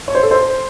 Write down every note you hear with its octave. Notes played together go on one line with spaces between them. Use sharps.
C#5
C5
A4
C5